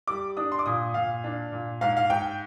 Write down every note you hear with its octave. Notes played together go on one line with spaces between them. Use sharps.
G3 D6
D4 D#6
C6
D6
A#2 D#6
A#2 F5
D4
A#2
G#2 F5
F5
G#2 G5